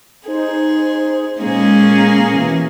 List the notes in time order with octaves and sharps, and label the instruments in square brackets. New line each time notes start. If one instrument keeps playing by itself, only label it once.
[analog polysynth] D#4 C5 [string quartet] G#4
[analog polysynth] A#2 G#3 [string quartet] A#3 C#4 G#4
[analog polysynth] B2 E3